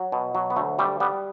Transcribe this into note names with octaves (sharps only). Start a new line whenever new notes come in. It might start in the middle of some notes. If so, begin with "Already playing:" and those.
Already playing: F#3
B2
F#3
B3
D2 A3
G3 A3
G3 B3